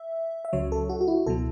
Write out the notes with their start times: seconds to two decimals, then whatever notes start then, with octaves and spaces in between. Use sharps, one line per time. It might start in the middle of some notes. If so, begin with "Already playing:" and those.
Already playing: E5
0.45 E5
0.53 C#2 C#3 F#3 C#5
0.72 A4
0.89 F#4
1.01 F#4
1.08 E4
1.26 C#2 B2 F#3 A4